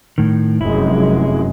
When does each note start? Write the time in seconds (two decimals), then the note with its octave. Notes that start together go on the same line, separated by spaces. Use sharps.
0.18 A2 D#3
0.61 F1 F#2 G#3 E4